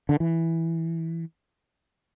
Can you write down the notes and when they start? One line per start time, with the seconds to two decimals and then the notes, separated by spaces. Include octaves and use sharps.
0.09 D3
0.20 E3